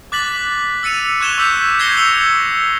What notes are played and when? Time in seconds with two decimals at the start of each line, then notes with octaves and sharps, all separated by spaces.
0.12 D6 F#6 A6 B6 F#7
0.83 E6 A6 C#7 D#7 F7
1.20 C#6 F#6 G#6 E7 F7 G7
1.37 C#6 D6 E6 G6 B6
1.79 G6 G#6 A#6 C7 C#7 G7
1.97 D6 E6 C#7 F7 G7